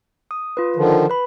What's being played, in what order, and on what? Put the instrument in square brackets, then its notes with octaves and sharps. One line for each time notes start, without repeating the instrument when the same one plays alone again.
[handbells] D#6
F4 B4
[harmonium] D3 D#3 F3
[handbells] B4 B5